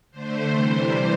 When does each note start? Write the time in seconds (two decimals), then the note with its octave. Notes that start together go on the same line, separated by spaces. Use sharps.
0.11 D3 A3 C5
0.50 C3 E3 G3